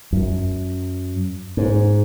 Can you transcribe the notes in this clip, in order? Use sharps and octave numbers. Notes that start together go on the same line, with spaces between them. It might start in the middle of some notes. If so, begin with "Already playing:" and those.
F#2
G#2